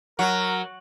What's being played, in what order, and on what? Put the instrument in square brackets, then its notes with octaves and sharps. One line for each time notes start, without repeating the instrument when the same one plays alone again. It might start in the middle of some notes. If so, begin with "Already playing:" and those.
[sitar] F#3 [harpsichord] F#4 [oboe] A#4